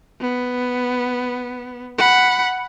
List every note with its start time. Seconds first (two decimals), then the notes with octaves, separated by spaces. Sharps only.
0.21 B3
1.98 F#5 B5